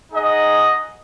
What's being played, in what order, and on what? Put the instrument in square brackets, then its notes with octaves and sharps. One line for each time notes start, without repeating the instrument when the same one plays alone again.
[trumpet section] D#4 G#4 D#5 F#5